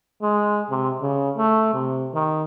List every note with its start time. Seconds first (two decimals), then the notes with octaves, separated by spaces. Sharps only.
0.22 G#3
0.70 C3
1.01 C#3
1.37 A3
1.74 C3
2.14 D#3